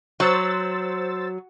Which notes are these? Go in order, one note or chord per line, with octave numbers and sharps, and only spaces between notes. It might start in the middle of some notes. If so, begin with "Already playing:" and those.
F#3 C5 E6 A6